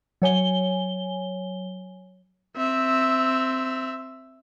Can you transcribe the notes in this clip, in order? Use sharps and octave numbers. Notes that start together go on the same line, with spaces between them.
F#3 C#5 G#5 G7
C4 E5